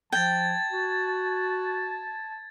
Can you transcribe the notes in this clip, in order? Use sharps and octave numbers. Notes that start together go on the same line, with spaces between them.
F3 G5 A5 G#6 A6
F#4